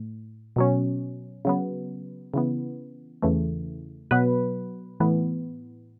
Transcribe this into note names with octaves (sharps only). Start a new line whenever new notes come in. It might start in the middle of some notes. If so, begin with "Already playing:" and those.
Already playing: A2
B2 F#3 C#4
C#3 F#3 B3
C#3 E3 B3
E2 C#3 E3 A3
B2 F#3 B3 B4
A2 E3 B3